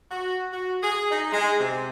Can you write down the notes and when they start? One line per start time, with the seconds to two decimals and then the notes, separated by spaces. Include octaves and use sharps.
0.11 F#4
0.52 F#4
0.83 G#4
1.10 D#4
1.33 G#3
1.60 C3